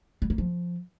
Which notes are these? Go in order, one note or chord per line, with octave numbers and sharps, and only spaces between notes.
G3
A#3
F3